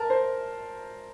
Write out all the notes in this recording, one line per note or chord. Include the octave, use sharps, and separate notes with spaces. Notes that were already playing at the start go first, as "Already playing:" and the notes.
Already playing: A#4 A5
C5